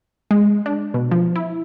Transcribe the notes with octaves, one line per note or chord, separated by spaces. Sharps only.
G#3
D4
B2
F3
E4